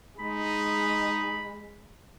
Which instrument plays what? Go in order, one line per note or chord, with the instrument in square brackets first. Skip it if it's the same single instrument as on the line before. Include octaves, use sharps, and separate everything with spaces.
[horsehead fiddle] G#3 [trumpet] D#4 [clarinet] B5